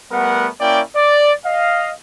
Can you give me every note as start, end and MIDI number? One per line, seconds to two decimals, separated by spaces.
0.12 0.48 55
0.12 0.48 57
0.12 0.48 59
0.12 0.48 70
0.12 0.48 78
0.60 0.82 58
0.60 0.82 61
0.60 0.82 64
0.60 0.82 74
0.60 0.82 79
0.96 1.34 74
1.46 1.92 75
1.46 1.92 77